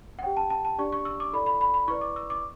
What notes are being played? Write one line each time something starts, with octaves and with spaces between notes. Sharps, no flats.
F#5
G4 C#5 G5
A5
A5
A5
D4 G4 D5 C#6
C#6
E6
D6
E4 A4 D5 B5
B5
B5
B5
E4 B4 D5 C#6
D6
E6
D6